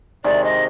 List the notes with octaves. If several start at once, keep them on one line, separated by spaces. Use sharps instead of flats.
C3 D#3 G#3 D5
D#5